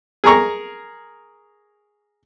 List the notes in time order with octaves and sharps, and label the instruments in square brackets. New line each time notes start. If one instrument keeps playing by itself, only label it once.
[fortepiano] G#4 A#4 A#5 C#6